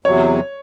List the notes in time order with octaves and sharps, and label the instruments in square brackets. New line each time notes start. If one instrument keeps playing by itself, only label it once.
[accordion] E2 C3 F#3 [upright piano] C#5